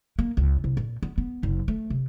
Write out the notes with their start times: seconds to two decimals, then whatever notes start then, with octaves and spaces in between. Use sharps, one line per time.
0.19 A#3
0.37 C#2
0.64 C2
0.77 A#2
1.03 B3
1.18 B3
1.43 F#1
1.68 A3
1.90 C3